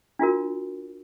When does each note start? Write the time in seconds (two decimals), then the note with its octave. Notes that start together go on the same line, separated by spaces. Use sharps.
0.19 D4 F4 F#4 A#4